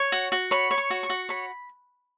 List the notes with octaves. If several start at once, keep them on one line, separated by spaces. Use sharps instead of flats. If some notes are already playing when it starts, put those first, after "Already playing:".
Already playing: C#5
F#4
F#4
C#5 B5
C#5
C#6
F#4
C#6
F#4
C#5 B5